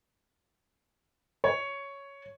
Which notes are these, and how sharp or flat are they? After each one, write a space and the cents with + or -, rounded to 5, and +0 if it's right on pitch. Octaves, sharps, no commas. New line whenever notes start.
C#5 +5